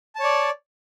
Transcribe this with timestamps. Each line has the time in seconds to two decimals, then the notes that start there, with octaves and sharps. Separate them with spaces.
0.16 A5
0.20 C#5
0.24 D5